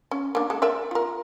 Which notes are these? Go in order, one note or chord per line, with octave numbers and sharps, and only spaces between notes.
C#4
A#3 D4
G#3 A4
A#4 D5 E5
F4 A#4